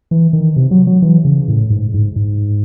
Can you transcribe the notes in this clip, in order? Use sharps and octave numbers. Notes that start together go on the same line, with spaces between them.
E3
D#3
C3
F#3
F#3
E3
C#3
A2
G#2
G#2
G#2